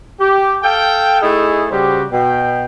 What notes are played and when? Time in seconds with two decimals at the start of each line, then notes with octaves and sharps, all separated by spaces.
0.20 G4
0.62 A4 F5 G5
1.21 A3 D#4 E4 G#4
1.69 C#3 G3 F#4 G4 C5
2.11 B2 G5